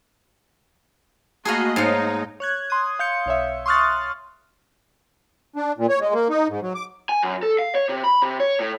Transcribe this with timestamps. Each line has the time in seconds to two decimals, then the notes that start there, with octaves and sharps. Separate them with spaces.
1.45 A3 A#3 F#4 G#4 B4 D#5 F5
1.76 G#2 D#4 C5 C#5 F5
2.40 C#5 F#6 G#6
2.70 C6 D#6
2.99 F5 G6 C#7
3.26 B1 C#5 E5
3.66 C6 C#6 D#6 F6 F#6 A6
5.56 D4
5.78 A#2
5.89 C#5
6.00 G#3
6.14 A#3
6.30 D#4
6.49 G#2
6.62 F#3
6.75 D6
7.09 G#5
7.22 F#2
7.43 A4
7.59 F5
7.75 C#5
7.89 C3
8.04 B5
8.22 C3
8.40 C#5
8.60 A2